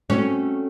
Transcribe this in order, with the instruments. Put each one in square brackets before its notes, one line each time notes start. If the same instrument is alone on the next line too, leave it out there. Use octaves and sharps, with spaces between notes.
[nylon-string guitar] A3 C4 F#4 A4 [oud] C#4